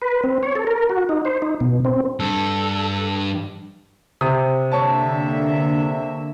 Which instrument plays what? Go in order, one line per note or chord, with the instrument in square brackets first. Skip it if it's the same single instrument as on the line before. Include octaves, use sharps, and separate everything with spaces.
[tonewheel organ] B4
C4
C#5
A4
A#4
F#4
D#4
C5
D#4
B2
C4
[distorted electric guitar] G2 [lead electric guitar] A4
[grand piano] C3 [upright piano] D#6
[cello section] D3 A#3 E5 [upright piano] C#5 A5